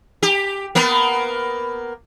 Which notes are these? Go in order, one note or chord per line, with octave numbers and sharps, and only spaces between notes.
G4
A#3 B3